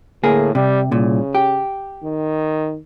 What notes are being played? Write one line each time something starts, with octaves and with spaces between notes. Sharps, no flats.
D2 A2 A#3 G#4
C3 G3
C2 A#2 C#3
G4
D#3